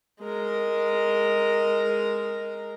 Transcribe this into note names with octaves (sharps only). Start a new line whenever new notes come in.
G#3 A#4